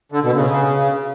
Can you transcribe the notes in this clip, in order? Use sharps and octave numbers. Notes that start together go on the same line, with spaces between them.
D3
B2
C#3